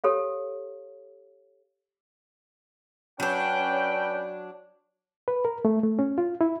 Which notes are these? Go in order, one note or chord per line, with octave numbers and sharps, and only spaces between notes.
G4 A4 C#5 F5
F#3 C#4 D4 B4 G5
B4
A#4
A3
A3
C#4
F4
E4